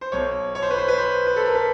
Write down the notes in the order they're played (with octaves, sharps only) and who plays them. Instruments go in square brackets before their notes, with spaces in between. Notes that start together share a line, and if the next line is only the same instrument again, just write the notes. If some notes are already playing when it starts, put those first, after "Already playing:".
[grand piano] C5
B1 B2 C#5
C#5
C5
B4
C5
B4
C5
B4
A4
A#4
B4